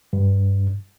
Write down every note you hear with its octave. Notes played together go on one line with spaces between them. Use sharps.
G2